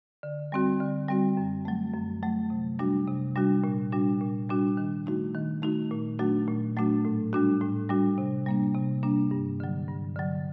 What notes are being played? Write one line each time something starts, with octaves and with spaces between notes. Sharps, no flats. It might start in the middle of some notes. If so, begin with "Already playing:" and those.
D3
G3 C4 F#4
D3
G3 C4 F#4
F#2
F#3 A3
F#2
F#3 A3
C3
G3 D4 F#4
C3
G3 D4 F#4
A#2
G3 D4 F#4
A#2
G3 D4 F#4
D#3
A3 D#4 F#4
D#3
A3 D#4 F#4
A#2
F#3 A3 D4 F#4
A#2
F#3 A3 D4 F#4
A2
G3 D4 F#4
A2
G3 D4 F#4
C3
G3 A#3 D4
C3
G3 A#3 D4
G2
D3 F#3
G2
D3 F#3